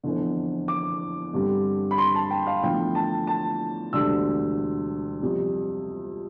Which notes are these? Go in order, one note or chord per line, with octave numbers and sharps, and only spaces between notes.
F1 E2 D3
D6
G2 D3 G3 C4
B5
C6
A5
G5
F5
E2 D3 F3 A3 G5
A5
A5
E1 D2 D3 G3 D4 E6
F2 C3 G3